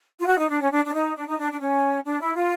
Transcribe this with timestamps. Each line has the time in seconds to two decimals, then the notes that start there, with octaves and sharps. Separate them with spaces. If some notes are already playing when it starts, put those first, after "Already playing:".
0.19 F4
0.26 F#4
0.38 D#4
0.49 D4
0.60 C#4
0.70 D4
0.84 D4
0.93 D#4
1.15 D4
1.27 D#4
1.38 D4
1.52 D4
1.59 C#4
2.04 D4
2.19 E4
2.34 F4